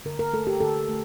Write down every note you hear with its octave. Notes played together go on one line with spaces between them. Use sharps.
D3 A#4
A#4
A3 A4
G4
D3 A4
A3